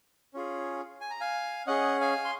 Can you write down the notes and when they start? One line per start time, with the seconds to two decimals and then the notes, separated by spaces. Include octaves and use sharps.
0.34 C#4 F4 G#4
1.01 G#5
1.11 A#5
1.20 F5 G#5
1.67 C#4 G#4 D#5 F#5
2.01 F5 G#5
2.25 C6